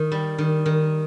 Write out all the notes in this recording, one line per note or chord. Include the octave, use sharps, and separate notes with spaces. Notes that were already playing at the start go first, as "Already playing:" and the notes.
Already playing: D#3
G3
D#3
D#3